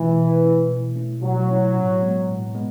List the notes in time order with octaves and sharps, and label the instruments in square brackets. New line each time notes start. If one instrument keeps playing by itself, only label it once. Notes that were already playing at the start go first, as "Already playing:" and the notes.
Already playing: [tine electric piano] B2 A3 C#4 E4 [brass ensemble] E3
[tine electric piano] B2
A3 C#4 E4
B2
A3 C#4 E4
[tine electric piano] B2 [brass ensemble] F#3
[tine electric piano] A3 C#4 E4
A2
G#3 B3
A2
G#3 B3